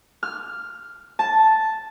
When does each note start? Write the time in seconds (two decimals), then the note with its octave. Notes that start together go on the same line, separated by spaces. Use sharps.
0.23 F6
1.19 A5